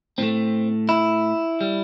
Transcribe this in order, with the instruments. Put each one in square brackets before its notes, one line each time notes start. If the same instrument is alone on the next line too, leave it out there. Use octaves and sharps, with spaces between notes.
[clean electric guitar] A2 A3 C4
E4
G3